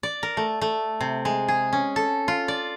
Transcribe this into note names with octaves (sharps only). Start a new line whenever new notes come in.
D5
A#4
A3
A3
C3
G#3
G#4
C#4
A4
F4
D5